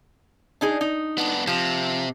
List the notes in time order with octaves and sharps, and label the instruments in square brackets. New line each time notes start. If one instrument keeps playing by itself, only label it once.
[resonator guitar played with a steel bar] D4 D#4 G#4
D#4
[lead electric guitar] B3 D4
[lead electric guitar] C3 [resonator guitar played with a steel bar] F3